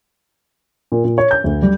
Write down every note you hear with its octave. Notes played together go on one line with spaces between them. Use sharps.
A#2
A#2
C#5
G6
D2
G3